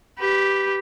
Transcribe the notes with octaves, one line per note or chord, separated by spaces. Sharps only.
G4 B4